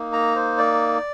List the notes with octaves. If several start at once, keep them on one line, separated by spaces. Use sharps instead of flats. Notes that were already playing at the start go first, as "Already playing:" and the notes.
Already playing: A#3 D#4
A#5
C5
D5